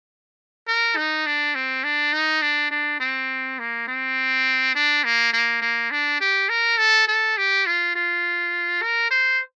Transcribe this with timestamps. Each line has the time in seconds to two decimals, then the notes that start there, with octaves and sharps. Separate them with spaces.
0.67 A#4
0.96 D#4
1.26 D4
1.55 C4
1.84 D4
2.13 D#4
2.42 D4
2.71 D4
3.00 C4
3.59 A#3
3.87 C4
4.75 D4
5.04 A#3
5.33 A#3
5.61 A#3
5.91 D4
6.21 G4
6.49 A#4
6.78 A4
7.08 A4
7.37 G4
7.66 F4
7.95 F4
8.82 A#4
9.11 C5